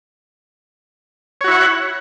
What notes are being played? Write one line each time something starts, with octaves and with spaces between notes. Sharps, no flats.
E4 F#4 C#5 F#5